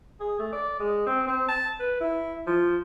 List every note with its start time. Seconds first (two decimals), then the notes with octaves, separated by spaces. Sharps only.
0.20 G#4
0.39 A3
0.53 D5
0.80 G#3
1.07 C4
1.27 C4
1.49 A5
1.80 B4
2.01 E4
2.47 F3